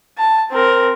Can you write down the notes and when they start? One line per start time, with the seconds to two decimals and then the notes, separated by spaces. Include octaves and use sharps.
0.18 A5
0.51 C4 A#4